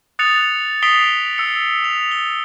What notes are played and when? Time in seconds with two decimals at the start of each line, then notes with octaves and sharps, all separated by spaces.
0.19 D#6 F#6 A6 C#7 F7
0.83 D#6 B6 C7 D7 F7 G7
1.38 E6 C#7
1.84 F7
2.11 G7